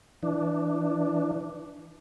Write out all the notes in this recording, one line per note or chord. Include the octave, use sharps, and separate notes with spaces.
E3 D4